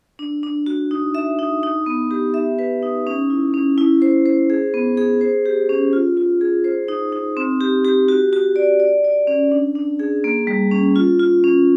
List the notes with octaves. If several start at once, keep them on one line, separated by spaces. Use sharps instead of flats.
D4
D4
F#4
D#4
E5
D#4
D#4
B3
G4
E5
B4
D#4
C#4
E4
C#4
E4
C5
C5
G#4
B3
G#4
C5
G4
C#4
F4
F4
G#4
C5
D#4
D#4
C4
G4
G4
F#4
F#4
D5
D5
D5
C#4
D4
D4
G#4
A#3
G3
C#4
F4
F4
C#4